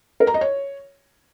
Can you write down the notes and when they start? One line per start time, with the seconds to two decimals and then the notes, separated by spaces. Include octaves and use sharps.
0.20 A#4
0.27 A#5
0.34 D#5
0.41 C#5